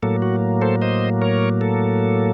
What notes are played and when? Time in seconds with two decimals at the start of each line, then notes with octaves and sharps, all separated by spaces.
0.03 A2 F#3 A#3 A4
0.22 F#4
0.61 A4 C5
0.82 C5 D#5
1.22 A#4 C#5
1.61 A4